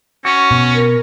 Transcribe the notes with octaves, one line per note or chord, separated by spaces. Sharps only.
C#4 F#4 C#6
B2
A#4